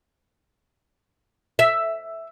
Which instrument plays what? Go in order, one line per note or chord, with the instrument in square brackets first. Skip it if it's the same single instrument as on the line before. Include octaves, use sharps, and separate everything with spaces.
[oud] E5